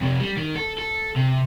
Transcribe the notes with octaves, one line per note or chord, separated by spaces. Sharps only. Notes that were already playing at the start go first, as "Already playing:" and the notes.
F2 C3
G3
D#3
A4
A4
C3